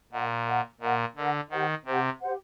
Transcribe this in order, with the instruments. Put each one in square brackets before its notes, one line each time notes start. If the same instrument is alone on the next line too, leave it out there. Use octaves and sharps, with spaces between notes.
[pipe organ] A#2 [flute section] A#4 D#5 F#5
[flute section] A#4 D#5 F#5
[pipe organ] A#2 [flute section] A#4 D#5 F#5
[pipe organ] D3 [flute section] A#4 D#5 F#5
[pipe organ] D#3 [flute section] G4 C5 F#5
[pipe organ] C3 [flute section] G4 C5 F#5
[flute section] G4 C5 F#5